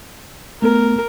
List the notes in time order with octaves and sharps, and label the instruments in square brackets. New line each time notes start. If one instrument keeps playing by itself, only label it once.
[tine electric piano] A3 B3 [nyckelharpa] A#4